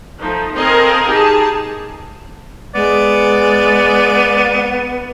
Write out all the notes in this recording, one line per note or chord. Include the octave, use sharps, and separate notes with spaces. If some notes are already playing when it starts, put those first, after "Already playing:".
F3 A3 D#4
C4 A4 A#4 D#5 F5 G#5
D#4 G4 G#4 A5
G#3 B3 D5